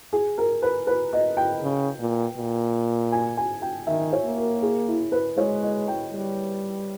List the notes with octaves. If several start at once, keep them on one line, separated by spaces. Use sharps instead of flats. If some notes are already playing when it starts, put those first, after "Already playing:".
G#4
A#4
B4
B4
D#5
G5
C#3
A#2
A#2
G#5
G#5
G5
D#3 E5
C#5
A#3
A#4
G#4
E4
B4
G#3 C#5
D#5
G5
G3